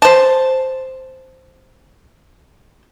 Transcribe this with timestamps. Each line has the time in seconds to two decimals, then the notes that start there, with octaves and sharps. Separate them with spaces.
0.02 C5 A5